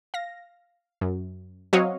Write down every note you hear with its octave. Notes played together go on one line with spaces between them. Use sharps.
F5 A#6
F#2
F#3 C4 F#4 C#5 D#5 F5